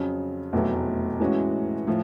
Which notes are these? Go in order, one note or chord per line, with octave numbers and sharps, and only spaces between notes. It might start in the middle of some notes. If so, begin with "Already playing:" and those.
Already playing: F2 C#3 F#3
F1 E2 B2 F#3 A3
A2 E3 G#3 C#4 F#4
A2 F3